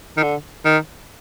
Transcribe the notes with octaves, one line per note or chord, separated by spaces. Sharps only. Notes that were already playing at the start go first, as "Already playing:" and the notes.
D#3
D3
D#3